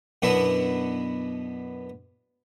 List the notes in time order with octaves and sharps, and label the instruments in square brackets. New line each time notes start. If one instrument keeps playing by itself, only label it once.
[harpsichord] F#2 B2 B3 D4 E4